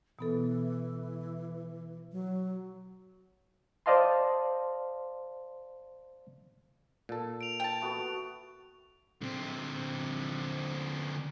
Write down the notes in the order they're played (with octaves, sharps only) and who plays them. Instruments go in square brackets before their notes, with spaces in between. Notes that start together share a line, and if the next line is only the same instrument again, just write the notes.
[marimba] B2 B3 A4 [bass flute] E3
[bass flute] F#3
[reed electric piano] C5 D5 D#5 F5 A5 C6
[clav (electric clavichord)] A#2 A4
[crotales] D7 F7
[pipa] G5 A5
[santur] A3 B3 F#4
[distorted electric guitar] D3 C4